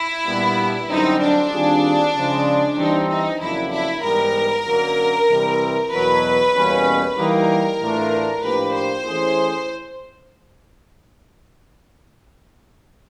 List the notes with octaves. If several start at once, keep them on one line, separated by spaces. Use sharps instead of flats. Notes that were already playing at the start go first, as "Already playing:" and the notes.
Already playing: E4
A#2 G3 B3 D4
F#2 D3 G3 C4 D#4
D4
D#3 G3 C4 F4 G#4
C#3 F3 G#3
E3 G3 C4 D#4
D#4
F2 C#3 F#3 A#3 D4 E4
E4
G#2 E3 G3 B3 A#4
F#2 D3 F#3 A#3
C3 E3 G3 C4
E2 B2 F#3 B4
E2 B2 G3 A#3 C#4
E3 G3 A#3 D#4 A#4
A2 E3 A3 D4 F4
A2 F3 A#3 D4 G4 B4
C5
E3 A3 C#4 E4 G#4